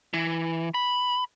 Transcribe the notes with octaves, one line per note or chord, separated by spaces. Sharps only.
E3
B5